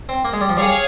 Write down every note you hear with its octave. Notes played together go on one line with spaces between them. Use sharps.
C4
A#3
G#3
G3
F3
G3 G#4 C#5 F5